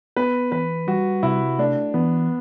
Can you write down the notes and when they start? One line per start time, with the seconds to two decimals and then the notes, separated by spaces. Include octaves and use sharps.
0.17 B3 B4
0.52 E3 B4
0.87 G3 F#4
1.23 C3 E4
1.59 A3 D4
1.94 E3 B3